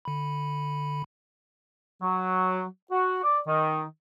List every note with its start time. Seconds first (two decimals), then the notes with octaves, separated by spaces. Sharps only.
0.05 D3 B5
2.02 F#3
2.91 F#4
3.24 D5
3.47 D#3